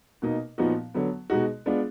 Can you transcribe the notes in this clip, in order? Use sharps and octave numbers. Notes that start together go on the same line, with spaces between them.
B2 A#3 D#4
A#2 F3 B3 D#4 F#4
D3 F#3 B3
B2 G#3 D#4 F#4
G#3 B3 D4 F4